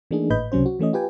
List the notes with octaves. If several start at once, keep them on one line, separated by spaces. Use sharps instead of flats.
E3 A3 A#3 D4 D#4 G#4
G#1 A2 B4 D#5 B5 G6
C#2 C3 F#3 C#4 C5
F#4
E3 A3 C#4 D#5
F4 G4 B4 G5 G#5